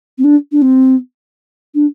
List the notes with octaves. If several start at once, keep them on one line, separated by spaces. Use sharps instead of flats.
C4
D4
D4
C4
D4